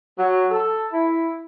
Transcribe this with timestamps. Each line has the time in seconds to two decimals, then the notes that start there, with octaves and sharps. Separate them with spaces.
0.18 F#3
0.51 A4
0.92 E4